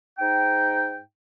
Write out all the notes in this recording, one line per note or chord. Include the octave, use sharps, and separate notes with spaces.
G#2 D#4 G5